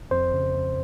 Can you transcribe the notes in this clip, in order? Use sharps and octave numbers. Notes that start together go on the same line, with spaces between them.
F2 C5
C#3
F2